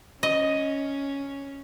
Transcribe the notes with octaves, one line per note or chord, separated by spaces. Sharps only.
C#4 D#5